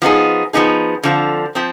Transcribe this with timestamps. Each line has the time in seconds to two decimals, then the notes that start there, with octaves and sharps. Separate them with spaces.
0.02 F3 B3 D#4 G#4
0.53 F3 B3 D#4 G#4
1.03 D3 F3 C4
1.55 F3 C4